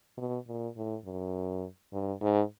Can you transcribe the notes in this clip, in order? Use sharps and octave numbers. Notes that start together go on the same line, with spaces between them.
B2
A#2
A2
F#2
G2
G#2